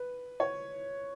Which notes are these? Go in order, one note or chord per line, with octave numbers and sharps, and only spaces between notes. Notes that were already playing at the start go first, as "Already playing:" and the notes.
Already playing: B4
C#5